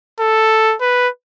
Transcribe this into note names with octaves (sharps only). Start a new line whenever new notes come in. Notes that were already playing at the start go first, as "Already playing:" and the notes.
A4
B4